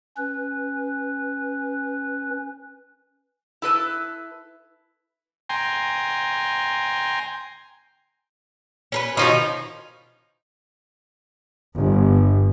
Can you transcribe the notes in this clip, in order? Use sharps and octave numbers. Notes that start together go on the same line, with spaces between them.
C#4 B4
E4 A4 B4
G5 G#5 A#5 C6
C#4 A#4 B4
B2 D#3 F3 C#4 D#4
G1